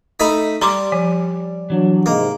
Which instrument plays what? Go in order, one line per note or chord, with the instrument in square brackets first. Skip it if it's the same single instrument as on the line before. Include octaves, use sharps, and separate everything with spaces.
[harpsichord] A3 D#4 B5
[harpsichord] G3 [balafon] A#5 C6 D6
[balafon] F3 [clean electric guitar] G#5
[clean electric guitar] E3 D4 [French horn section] F#3
[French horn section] G#2 C3 G#3 [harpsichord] A#3